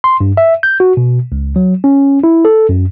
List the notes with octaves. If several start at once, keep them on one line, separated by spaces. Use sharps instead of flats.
C6
G2
E5
G6
F#4
B2
C#2
F#3
C#4
E4
A4
F#2